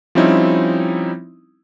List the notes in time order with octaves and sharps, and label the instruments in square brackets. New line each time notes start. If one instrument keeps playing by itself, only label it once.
[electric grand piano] F3 G3 C4 C#4 D#4 E4